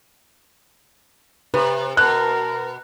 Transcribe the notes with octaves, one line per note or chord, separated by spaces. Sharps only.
C3 B4
B2 A#4 F#6